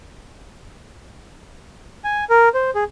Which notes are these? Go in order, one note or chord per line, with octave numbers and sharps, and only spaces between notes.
G#5
A#4
C5
G#4